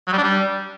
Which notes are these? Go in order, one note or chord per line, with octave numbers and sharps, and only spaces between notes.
F#3
G3
D4
G3